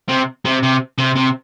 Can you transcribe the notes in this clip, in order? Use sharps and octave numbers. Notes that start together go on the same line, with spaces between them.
C3
C3
C3
C3
C3